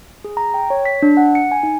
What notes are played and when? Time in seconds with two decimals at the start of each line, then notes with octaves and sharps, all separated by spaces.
0.24 G#4
0.37 A#5
0.54 G5
0.70 C#5
0.85 B6
1.02 D4
1.17 F#5
1.35 C#7
1.52 G#5
1.63 D#4